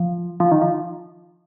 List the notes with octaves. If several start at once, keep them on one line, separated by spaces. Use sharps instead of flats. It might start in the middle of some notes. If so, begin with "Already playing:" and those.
Already playing: F3
F3
D#3
F3